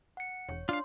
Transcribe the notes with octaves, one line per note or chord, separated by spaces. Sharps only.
F#5 C#7
E1 C#5
D4 F4 F5 C6